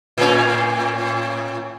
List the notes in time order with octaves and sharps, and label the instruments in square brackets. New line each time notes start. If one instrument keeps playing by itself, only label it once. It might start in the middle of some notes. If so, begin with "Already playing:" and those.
[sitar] A2 C#4